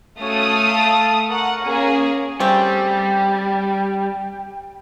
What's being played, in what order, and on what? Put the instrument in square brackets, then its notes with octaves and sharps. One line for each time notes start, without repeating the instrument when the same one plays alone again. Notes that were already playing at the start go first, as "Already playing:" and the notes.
[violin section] A3 F5 D#6 [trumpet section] C#4 F#4 C#5
[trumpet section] A4 A5
[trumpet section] A#4 A#5 C#6 [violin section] F#5
[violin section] A#3 C#4 G#4
[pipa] C#3 A3 C4 [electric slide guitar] G3 [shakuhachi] G5